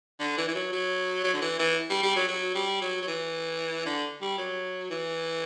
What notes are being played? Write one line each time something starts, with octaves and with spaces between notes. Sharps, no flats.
D3
E3
E3
F#3
F#3
F#3
D3
E3
E3
G3
G3
F#3
F#3
G3
F#3
F#3
E3
D3
G3
F#3
E3